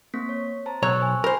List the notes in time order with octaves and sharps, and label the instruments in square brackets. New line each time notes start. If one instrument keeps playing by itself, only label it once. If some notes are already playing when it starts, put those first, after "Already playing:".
[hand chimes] A#3 C4 B6
C#5
C5 A5 A#5
[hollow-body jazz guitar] B1 C#5 A#5 [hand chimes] C#6 E6 F#6
[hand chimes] C5 G#5
[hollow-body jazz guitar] A#4 C5 [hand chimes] G#5 B5